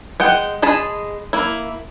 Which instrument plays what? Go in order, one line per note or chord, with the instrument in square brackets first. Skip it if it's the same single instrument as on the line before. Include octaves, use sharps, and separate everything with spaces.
[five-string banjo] G#3 F#5 G5
G#3 G#4 A5 B5
A#3 E4